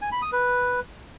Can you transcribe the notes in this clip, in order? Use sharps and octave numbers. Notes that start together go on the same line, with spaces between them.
G#5
B5
D#6
B4